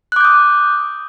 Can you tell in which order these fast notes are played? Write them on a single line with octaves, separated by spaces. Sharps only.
F#6 D6 G6 D#6